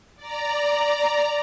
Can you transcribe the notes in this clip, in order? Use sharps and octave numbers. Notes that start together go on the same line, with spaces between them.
D5 A#5